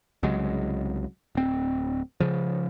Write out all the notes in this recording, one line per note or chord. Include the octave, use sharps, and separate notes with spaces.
C2 C#3 F#3 G#3
D1 C4
C#3 F3